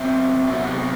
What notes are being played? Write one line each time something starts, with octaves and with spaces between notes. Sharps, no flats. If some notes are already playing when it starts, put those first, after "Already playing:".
Already playing: B2 F#3 C4 E5
C3 F#3 B3 E5
F#5
G4
D#4